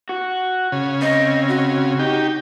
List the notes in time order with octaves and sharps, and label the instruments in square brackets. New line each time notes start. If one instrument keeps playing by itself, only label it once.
[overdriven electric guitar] F#4
[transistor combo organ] C#3
[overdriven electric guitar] C4 [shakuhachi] D#5
[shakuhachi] F#4
[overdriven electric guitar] D#4 [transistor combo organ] G4